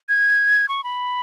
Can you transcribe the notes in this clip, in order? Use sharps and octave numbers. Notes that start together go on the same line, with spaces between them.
G#6
C#6
B5